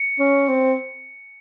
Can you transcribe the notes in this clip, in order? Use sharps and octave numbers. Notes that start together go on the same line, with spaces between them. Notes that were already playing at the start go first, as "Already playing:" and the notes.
Already playing: C#7
C#4
C4